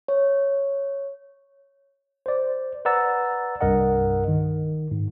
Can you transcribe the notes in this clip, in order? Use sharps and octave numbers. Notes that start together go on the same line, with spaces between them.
C#5
C5 D5
B4 D5 F#5 A#5 E6 A6
C2 G2 A#4 D#5 F#5
D#3
G#2